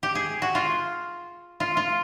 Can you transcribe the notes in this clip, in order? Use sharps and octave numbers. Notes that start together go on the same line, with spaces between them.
G4
G#4
F#4
F4
F4
F4